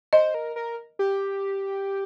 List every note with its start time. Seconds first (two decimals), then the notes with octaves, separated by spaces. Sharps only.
0.13 C5 D#5
0.34 A#4
0.56 A#4
0.99 G4